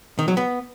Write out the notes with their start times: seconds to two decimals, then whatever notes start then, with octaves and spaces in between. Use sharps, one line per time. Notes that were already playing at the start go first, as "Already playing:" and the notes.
0.19 D#3
0.28 F#3
0.37 B3